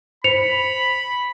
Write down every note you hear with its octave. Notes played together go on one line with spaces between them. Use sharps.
C5 B5 C#7 F7